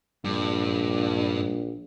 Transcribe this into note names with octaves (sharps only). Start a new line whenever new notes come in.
A#1 G2